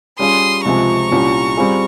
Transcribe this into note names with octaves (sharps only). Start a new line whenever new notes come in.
G3 C#4 F4 G#4 C6 D#6
C#2 C3 F3 G#3 C4 A#5 C#6
C2 A#2 G3 C#4 G4
G3 C4 F4 G#4